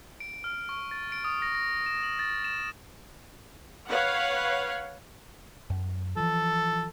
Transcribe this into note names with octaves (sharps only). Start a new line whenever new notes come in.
D7
F6
C#6
A6
D7
D#6
A#6
A#6
E7
F#7
A6
E7
B4 C#5 F5 F#5
F#2
E3 F3 A4